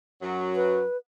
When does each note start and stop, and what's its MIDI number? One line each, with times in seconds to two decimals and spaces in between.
0.22 0.83 42
0.22 0.83 54
0.56 0.97 71